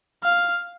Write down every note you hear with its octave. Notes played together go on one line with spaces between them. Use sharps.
F5